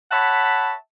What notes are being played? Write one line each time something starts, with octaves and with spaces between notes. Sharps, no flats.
C#5 E5 F#5 A5 B5